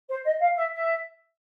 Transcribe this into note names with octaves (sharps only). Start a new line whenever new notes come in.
C5
D#5
F5
E5
E5